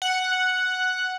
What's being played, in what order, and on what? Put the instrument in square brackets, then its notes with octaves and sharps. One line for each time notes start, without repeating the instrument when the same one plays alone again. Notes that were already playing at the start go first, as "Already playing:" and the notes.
[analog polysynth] F#5